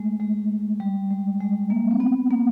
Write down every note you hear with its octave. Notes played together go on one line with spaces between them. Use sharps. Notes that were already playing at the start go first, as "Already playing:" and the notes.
Already playing: G#3 A3
G#3
G3
G#3
G#3
A#3
C4
B3
A#3